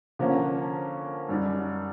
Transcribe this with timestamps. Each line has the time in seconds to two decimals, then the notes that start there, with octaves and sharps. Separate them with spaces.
0.19 D3 F3 A#3 C#4
1.29 F#2 D#3 G3